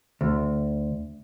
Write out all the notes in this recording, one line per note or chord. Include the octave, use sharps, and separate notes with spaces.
D2